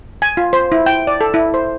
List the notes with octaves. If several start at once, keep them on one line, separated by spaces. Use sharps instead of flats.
G#5
F4
C5
E4
G5
D5
A4
E4
C5